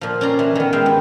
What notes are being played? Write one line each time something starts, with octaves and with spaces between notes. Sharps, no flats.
A#2 F3
C#4 D5 A#5 C6
E3
D#3 B3
G#3 E5 F5 G5
G2